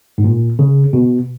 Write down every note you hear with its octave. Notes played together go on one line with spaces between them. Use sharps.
G#2
A#2
C#3
B2